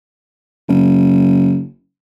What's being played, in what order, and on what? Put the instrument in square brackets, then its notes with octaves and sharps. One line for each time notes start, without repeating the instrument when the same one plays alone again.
[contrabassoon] F#1